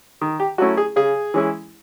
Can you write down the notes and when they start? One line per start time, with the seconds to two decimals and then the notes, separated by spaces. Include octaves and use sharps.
0.21 D#3
0.40 G4
0.58 F#3 A3 C#4 E4 F#4
0.77 G#4
0.96 C#3 G#4
1.34 E3 G#3 C#4 E4